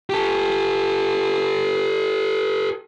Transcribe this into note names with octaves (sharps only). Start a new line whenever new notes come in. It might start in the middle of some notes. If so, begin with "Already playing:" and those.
G4 A4